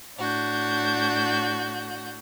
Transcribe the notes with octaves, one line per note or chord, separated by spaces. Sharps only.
A2 D4 F#4 G6